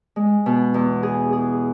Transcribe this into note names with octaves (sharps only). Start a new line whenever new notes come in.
G#3
B2
E2
G#4
G#4